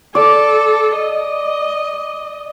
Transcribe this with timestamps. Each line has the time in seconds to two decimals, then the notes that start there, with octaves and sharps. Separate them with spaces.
0.15 A4 D5
0.96 D#5